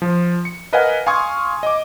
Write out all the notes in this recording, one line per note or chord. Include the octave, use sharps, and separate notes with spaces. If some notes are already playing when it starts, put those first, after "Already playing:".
F3
C#7
A#4 B4 D#5 F5 F#5 G#5
F5 G#5 C6 C#6 D#6 G#6
D#5 D6